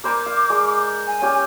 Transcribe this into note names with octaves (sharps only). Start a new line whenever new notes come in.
A#4 C5 G#5 D6
F5
G#3
G#5
C#4 G4